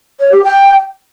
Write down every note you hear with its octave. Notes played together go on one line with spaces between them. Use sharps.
C#5
G4
G5